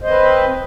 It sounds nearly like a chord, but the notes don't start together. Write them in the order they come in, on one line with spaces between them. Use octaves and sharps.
C5 D#5 C4 B4